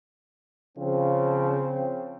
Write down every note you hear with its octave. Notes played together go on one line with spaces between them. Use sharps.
C#3 F3 C4